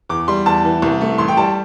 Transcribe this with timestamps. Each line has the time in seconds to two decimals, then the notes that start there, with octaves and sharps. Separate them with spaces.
0.09 E2 D6
0.28 G3 C6
0.46 E2 A5
0.65 E3
0.82 C2
1.01 A3
1.18 A1 C6
1.28 G5
1.37 G3 A5